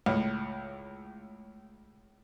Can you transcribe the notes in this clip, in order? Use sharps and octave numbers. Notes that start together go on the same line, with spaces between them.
C#2 A2